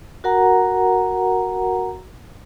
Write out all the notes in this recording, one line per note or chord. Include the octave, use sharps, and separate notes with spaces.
F#4 A#4 F#5 A#5